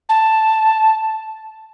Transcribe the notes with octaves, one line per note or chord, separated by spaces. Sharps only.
A5